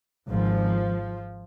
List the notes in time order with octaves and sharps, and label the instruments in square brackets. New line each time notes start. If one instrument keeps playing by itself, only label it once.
[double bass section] G#1 G#2 F3